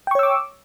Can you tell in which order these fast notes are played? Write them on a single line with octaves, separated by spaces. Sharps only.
G5 C#6 C#5 E6 D6